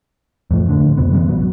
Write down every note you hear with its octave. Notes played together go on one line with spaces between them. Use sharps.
F2 A2 F3
A2 D3
F2 C3 B3
E3 F#3 A#3 B3
A#1 F#3